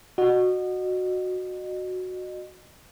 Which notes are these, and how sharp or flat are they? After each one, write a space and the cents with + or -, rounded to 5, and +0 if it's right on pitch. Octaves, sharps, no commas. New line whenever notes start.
F#4 -5 D#5 -30